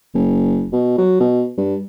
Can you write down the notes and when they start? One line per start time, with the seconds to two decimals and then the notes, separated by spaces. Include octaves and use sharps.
0.14 F#1
0.73 B2
0.98 F#3
1.20 B2
1.57 G2